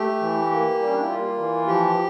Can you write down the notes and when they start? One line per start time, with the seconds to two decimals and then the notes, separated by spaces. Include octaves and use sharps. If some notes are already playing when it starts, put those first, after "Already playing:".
Already playing: A3 G4
0.21 E3
0.51 A#3
0.80 G3
0.87 C#4
0.94 D4
1.01 E4
1.08 A#3 F4
1.39 E3
1.67 F3 G4